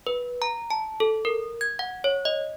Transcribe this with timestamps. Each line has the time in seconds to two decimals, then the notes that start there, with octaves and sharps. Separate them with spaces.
0.07 B4
0.42 A#5
0.70 A5
1.00 A4
1.25 A#4
1.61 G#6
1.79 F#5
2.04 C#5
2.25 D#5